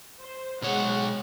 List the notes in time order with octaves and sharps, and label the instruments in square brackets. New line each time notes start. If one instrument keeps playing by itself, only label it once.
[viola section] C5
[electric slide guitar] B2 C#5 [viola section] G#3 F#5